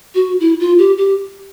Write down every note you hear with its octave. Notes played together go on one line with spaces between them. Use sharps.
F#4
E4
F4
G4
G4